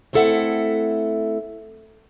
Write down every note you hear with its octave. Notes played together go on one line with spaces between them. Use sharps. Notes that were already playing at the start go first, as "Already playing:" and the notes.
A3 C4 E4 A4 E5 F#5